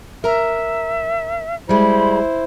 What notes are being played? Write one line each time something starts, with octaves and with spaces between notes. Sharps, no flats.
A#4 E5 A#5
G3 G#3 E4 C5 B5